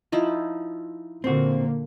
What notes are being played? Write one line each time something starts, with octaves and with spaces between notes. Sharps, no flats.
F3 D#4 E4
A#2 D3 A#3 C4 F#4